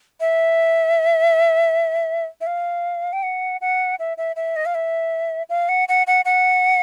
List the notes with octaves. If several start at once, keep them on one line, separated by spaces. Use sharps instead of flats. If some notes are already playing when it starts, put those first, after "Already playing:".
E5
E5
F5
G5
F#5
F#5
E5
E5
E5
D#5
F5
E5
F5
F#5
F#5
F#5
F#5